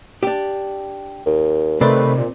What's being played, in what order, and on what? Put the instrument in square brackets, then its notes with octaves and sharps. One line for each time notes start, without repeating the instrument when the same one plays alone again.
[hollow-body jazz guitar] D4 G4
[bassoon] D#2
[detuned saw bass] C3 [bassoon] D#3 [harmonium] A3 B4 [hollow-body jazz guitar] C4 C5 D5
[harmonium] A#2